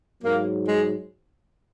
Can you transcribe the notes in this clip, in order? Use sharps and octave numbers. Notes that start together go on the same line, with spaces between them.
G#2 F#3 A#3
G#3